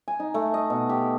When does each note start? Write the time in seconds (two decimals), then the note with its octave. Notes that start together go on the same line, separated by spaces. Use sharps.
0.08 G#5
0.20 D#4
0.34 A3
0.54 D#5
0.70 B2
0.89 G4